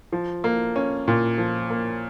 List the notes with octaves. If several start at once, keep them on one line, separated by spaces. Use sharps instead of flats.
F3
A#3
C#4
A#2
F3
A#3